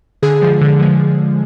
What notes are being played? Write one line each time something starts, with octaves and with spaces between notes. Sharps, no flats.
D3 G#4
F3 G#3
D3
F3 G#3